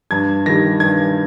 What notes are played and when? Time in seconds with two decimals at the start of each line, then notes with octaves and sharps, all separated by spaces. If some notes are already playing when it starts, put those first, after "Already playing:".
0.11 G2 G#6
0.46 D#3 G3 A#6
0.80 G2 G#6